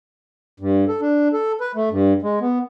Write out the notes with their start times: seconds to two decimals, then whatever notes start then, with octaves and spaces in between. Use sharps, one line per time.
0.60 G2
0.88 A4
1.01 D4
1.33 A4
1.61 B4
1.75 A3
1.91 G2
2.22 G#3
2.41 B3